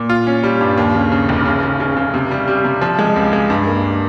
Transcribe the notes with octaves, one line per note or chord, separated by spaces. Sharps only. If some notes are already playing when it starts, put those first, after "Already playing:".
Already playing: A#2
F4
C#4
G3
G2
D#2
C#3
C#3
F1
C#3
C#3
C#3
C#3
C3
G3
G3
C3
F3
G#3
C#2
G#3
G2
A#3